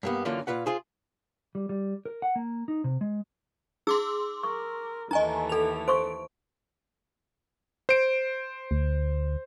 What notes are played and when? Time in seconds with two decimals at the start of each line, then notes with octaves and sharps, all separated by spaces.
0.03 G2 A#3 B3
0.25 F#2 D3 E3 A#3 F4
0.47 A#2 F4 B4 F#5
0.66 F4 G#4 C5
1.55 G3
1.69 G3
2.05 A#4
2.22 F#5
2.36 A#3
2.68 D#4
2.84 C3
3.01 G#3
3.87 D#4 G#4 C6 D6 E6
4.43 A#4 C#6
5.11 D#2 E3 A3 D#4 D#5 G#5 A#5
5.49 A4 F7
5.88 C5 C6 C#6 D7
7.89 C5 D7
8.71 D2